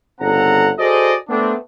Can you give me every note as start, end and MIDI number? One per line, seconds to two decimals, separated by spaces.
0.20 0.71 31
0.20 0.71 49
0.20 0.71 60
0.20 0.71 69
0.20 0.71 78
0.20 0.71 82
0.78 1.14 66
0.78 1.14 68
0.78 1.14 69
0.78 1.14 72
0.78 1.14 74
0.78 1.14 75
1.29 1.54 57
1.29 1.54 59
1.29 1.54 60
1.29 1.54 62